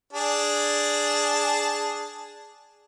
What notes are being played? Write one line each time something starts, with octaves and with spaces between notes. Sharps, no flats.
D4 G#4 A5